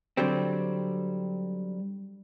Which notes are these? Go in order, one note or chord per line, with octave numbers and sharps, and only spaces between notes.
D3 F#3 G3 C4